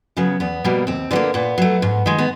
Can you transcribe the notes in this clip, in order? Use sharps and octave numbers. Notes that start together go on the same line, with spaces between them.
C#3 F#3 B3
E2 B3
B2 G3 A#3
D#2 C4
D3 G3 A#3 B3
A#2 B3
F#3 A3
G#2
D#3 G#3
B3